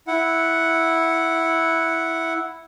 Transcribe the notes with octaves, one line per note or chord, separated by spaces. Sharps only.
E4 F#5